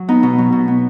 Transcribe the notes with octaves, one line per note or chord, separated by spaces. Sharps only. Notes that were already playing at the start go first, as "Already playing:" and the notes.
Already playing: F#3
B3 D#4
B2
F#3
B2
B3